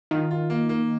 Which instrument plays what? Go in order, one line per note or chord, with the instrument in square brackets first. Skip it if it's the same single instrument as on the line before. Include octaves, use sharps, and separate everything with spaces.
[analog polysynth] D#3 [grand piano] F4
[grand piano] F4
A#3
A#3